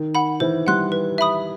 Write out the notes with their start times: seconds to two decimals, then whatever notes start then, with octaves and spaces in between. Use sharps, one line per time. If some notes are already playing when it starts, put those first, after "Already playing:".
Already playing: D#3
0.15 F#5 B5
0.40 E3 C5
0.67 G3 F#5 C6 F#6
0.92 B4
1.18 E5 B5 D#6